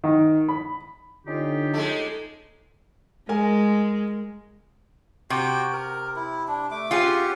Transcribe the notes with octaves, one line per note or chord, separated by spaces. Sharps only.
D#3
B5
D3 C#4 D#4 F4 G4
G#3 A3
G#3 A#4 G#5
C3 F#4 G5
A#4
E4
D4
A3 D6
C#4 F4 G4 G#4 F#5